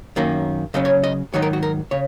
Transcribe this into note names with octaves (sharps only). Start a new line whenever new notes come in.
F#2 D#3 A#3 C#4
C#3 F#3 C#4 D#5
C#5
D#5
G#2 D#3 F#3 D#4 C#5
A#4
F#4
A#4
C#3 C#5